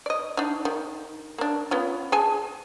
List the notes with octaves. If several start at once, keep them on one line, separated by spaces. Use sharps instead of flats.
D5 D#5
D4 D#4
D#3
A#3 D4
B3 C#4 F4
G#4 G#5 A5